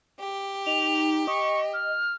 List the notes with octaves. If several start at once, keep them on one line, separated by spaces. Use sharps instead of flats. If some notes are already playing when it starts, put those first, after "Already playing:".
G4
D#4 F7
D#5 C#6
F6